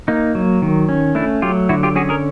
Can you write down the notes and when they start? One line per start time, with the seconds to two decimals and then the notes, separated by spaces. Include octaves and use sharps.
0.08 A#3 D#4
0.35 F#3
0.62 D#3
0.89 C#4
1.15 A3 D4 E4
1.42 F#3 F4 G4
1.69 D3 E4 F#4
1.83 F4 G4
1.96 C#4 F#4 G#4
2.09 G#4 A#4